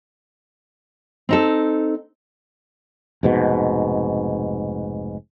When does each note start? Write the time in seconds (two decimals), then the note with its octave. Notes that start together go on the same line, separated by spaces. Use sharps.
1.29 C4 D#4 A4
3.23 F1 G#2 B2